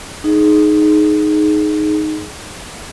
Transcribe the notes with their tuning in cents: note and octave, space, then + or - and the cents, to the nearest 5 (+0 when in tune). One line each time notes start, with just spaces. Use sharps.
D#4 -5 G#4 +20